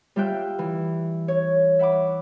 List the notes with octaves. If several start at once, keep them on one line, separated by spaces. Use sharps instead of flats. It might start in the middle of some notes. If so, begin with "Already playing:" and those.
G3 F4 E5 G5 F#6
E3
C#5
E5 F#5 B5 D6